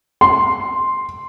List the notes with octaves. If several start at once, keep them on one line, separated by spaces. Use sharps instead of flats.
C6